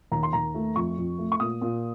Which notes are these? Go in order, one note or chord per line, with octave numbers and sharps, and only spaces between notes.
D#2 A#5
C6
D#2 A#5
A3
F2 C#6
F2
A3
C#6
A#2 D#6
A#2